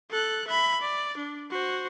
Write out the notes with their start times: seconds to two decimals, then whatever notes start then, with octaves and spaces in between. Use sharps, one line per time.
0.11 A4 F#6
0.48 E5 B5
0.81 D5
1.17 D4
1.51 F#4 C5